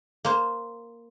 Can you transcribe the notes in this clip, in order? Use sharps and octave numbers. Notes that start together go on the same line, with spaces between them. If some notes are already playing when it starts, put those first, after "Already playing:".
A#3 C5